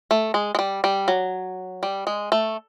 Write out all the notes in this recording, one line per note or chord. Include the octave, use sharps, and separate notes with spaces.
A3
G#3
G#3
G3
G3
F#3
G3
G#3
A3